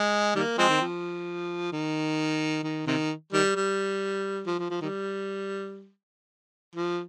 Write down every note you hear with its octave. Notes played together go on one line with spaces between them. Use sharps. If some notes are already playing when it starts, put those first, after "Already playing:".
Already playing: G#3
D#3 G3 A#3
F3 G#3 C4
D#3
F3
D#3
D#3
C3 D#3
D#3 G3
G3
F3
F3
F3
D#3 G3
F3